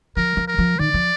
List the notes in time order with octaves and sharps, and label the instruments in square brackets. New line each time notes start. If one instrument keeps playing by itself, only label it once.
[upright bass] F3 [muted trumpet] A#4
[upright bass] F3
[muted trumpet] A#4
[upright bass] F3
[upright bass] D#3 [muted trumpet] D5
[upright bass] F3